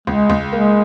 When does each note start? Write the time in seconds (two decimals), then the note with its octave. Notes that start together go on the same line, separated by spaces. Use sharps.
0.07 C#2 G#3
0.30 C#2
0.52 G#3 A#3